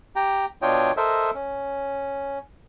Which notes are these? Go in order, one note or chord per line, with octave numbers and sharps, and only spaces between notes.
G4 G5 A#5
B2 D4 F4 C#5 D#5 G5
A4 A#4 C5 D#5 E5
C#4